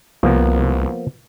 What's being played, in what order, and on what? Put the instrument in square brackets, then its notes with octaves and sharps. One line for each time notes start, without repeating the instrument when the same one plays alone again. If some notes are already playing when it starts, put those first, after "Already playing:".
[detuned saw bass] C2 [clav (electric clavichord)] F3 A#3 B3